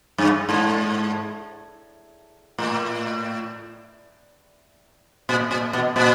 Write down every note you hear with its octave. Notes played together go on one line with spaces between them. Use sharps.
G2
G#2
A2
A#2
A#2
B2
A#2